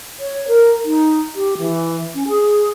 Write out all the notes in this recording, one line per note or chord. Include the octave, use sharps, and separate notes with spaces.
C#5
A#4
D#4
G4
E3
C#4
G#4